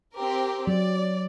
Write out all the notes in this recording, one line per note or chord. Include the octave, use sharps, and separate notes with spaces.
C4 G4 A#4
F#3 D5